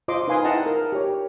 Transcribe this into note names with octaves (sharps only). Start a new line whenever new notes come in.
F4 C5 D#5 C6 D6
D#4 B4 F5 G#5 C6 D#6
E4 D#5 F#5 G5 A5 A#5
A#4
G4 C#5